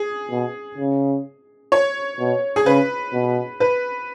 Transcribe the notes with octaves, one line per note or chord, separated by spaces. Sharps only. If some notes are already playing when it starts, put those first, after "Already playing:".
Already playing: G#4
B2
C#3
C#5
B2
G#4
C#3 B4
B2
B4